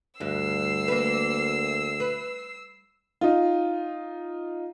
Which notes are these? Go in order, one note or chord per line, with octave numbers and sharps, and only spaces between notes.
D2 G2 E6 C7
A#3 B4
B4
D#4 F4